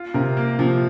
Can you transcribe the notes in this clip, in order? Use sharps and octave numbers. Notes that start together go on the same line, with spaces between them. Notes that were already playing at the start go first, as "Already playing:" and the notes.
Already playing: F4
C3 A#4
A#3
C3 F3